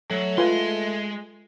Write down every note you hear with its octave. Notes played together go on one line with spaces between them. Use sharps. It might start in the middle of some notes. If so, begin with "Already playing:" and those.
F#3 A3
G#3 F4 B4 G#5 C6